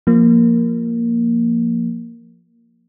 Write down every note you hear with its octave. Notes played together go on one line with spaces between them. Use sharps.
F3 A#3